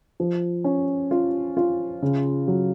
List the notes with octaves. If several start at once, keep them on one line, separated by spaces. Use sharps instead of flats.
F3
C#4
F4
F4
C#3
F#3